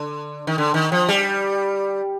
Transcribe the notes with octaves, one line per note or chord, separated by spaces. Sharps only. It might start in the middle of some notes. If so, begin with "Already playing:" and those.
Already playing: D3
D#3
D3
D#3
F3
G3